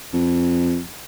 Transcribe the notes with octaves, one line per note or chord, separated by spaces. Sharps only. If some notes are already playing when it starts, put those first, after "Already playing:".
F2